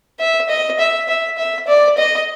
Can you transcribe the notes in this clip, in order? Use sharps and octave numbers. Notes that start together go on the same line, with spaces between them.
E5
D#5
E5
E5
E5
D5
D#5